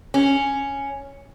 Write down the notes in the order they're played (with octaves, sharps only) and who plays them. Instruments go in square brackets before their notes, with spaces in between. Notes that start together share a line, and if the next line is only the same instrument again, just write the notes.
[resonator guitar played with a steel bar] C#4